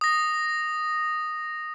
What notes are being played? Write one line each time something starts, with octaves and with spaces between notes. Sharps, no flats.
D#6 A#6